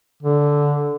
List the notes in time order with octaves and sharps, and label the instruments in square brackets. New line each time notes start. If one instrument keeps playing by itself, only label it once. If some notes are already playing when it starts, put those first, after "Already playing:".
[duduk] D3